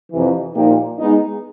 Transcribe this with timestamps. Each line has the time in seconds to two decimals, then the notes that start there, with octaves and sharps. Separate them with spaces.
0.12 F2 C3 E3
0.55 A#2 F3 A#3 D#4 G4
0.99 G#3 B3 D#4